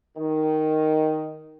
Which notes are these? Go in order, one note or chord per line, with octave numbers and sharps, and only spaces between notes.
D#3